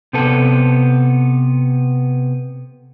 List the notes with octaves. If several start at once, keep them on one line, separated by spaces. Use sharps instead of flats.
C3 B3 A4